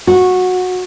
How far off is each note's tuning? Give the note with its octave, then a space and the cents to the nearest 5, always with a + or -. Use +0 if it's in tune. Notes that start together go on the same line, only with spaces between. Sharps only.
F#4 -15